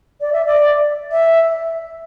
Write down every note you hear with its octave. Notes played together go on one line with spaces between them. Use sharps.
D5
E5
D5
E5